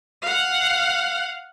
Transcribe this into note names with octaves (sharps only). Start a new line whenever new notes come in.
F5 F#5